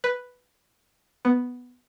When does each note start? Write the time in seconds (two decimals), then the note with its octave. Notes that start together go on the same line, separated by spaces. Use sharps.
0.04 B4
1.25 B3